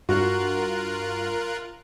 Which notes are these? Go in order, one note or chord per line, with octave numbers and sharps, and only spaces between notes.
G2 F4 F#4 A#4 F#5 F#6